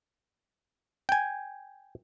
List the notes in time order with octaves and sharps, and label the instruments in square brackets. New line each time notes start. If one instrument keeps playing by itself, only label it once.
[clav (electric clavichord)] G5 G#5